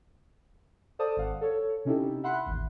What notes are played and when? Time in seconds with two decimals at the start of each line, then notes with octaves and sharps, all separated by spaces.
0.99 A4 C5 D5 F5 A5 D#6
1.17 G#1 F5 F#5
1.41 A4 C#5
1.85 C3 C#4 D#4 E4 G4 A4
2.23 E5 F#5 B5 C6 F#6
2.46 A1 D#2